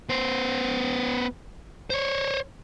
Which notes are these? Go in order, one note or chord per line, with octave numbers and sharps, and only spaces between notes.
B3 C5
C5 C#5